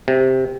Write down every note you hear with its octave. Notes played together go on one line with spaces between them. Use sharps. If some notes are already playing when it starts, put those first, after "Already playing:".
C3